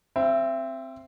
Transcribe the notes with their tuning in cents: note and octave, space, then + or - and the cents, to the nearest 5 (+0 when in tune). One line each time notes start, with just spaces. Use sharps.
C4 +0 E5 +30